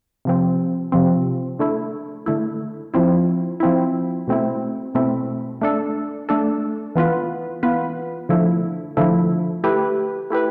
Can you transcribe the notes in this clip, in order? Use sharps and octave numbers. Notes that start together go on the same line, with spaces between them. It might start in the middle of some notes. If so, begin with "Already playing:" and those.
C3 F3 C4
C3 F3 C4
D3 A3 E4
D3 A3 E4
F3 C4 E4
F3 C4 E4
B2 A3 C4 E4
B2 A3 C4 E4
A3 D4 A4
A3 D4 A4
E3 B3 F4 B4
E3 B3 F4 B4
D3 F3 A3 E4
D3 F3 A3 E4
A3 E4 G4 B4
A3 E4 G4 B4